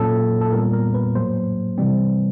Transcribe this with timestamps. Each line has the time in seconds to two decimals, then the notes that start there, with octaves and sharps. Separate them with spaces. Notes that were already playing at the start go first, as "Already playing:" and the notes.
Already playing: A#2 F#3 A#3 C#4 A4
0.41 A4
0.52 A#2 G3 B3 A#4
0.73 A#4
0.94 B4
1.15 A2 F#3 A#3 C5
1.78 C3 E3 G3 C4